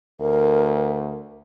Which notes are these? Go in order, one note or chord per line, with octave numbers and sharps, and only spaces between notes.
D2 A#4